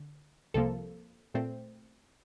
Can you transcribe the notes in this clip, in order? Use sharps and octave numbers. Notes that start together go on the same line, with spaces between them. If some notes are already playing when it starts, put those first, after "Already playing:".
Already playing: D3
C2 C3 F3 A#3 A4
A#2 A3 C4